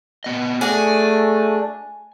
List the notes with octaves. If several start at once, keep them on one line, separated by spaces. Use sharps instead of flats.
A#2 B3 D#5
A3 D4 F#4 G#4 G#5